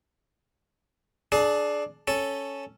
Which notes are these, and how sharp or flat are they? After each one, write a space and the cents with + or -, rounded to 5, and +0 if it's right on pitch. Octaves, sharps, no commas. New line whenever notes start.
D4 +0 G#4 +30
C#4 +0 A4 +0